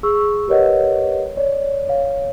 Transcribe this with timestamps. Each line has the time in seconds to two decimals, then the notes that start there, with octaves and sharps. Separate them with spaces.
0.03 G#4 C#6 E6
0.48 G4 A#4 B4 C#5 D#5 F#5
1.37 C#5 D5
1.89 C#5 F5